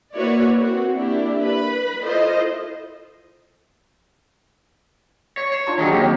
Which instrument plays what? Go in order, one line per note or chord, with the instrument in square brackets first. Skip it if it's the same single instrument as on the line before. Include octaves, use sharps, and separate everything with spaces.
[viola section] A#3 E4 F#4 B4 C#5 D5
C4 F#4
A#3 D4 E4 G4
B4 B5
E4 F4 A4 C5 D#5
[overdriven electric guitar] C#5
[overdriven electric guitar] C#5 [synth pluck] C7 E7
[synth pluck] D4 F4 A5
[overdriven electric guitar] D#3 F#3 [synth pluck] F#4 G#4 D#5
[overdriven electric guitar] D#2 [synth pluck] F#3 C4 G4